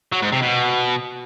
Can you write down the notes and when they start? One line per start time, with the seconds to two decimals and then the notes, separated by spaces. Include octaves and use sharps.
0.13 F#3
0.23 G#2
0.32 C3
0.42 B2